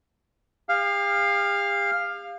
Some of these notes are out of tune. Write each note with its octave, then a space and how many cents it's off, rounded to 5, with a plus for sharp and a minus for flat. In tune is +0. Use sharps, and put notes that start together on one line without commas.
G4 +45 F5 +0